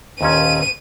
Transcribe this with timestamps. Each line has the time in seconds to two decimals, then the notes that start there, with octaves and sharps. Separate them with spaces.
0.21 D#2 A#2 C#4 D#7